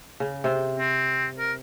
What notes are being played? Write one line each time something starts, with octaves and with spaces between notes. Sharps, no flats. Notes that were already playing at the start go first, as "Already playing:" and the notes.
C#3
C3 C5
C4
A#4